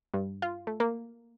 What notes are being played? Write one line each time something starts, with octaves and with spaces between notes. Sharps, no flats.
G2
F4
A3
A#3